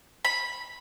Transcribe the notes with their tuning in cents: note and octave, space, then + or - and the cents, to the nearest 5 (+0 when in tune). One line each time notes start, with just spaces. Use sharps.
B5 -10